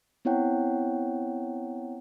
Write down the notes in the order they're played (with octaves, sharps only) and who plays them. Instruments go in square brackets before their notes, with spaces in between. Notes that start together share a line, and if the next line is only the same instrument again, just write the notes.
[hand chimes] B3 C4 E4 C#5 F#5 G5